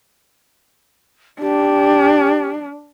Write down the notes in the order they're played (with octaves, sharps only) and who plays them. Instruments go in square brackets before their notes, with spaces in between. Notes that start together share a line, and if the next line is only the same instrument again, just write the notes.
[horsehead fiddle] D4 [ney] G4